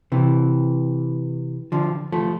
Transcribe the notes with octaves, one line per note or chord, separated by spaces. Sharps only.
C3 E3
D3 F3
F3 A3